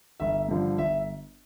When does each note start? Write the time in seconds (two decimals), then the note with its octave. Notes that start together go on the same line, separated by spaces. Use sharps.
0.20 G1 E5
0.49 G2 D3 F3
0.78 G1 E5